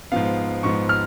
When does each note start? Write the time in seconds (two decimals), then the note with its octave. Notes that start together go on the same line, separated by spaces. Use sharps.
0.12 G#2 F3 B3 F5
0.63 G#2 F3 B3 C#6
0.89 F6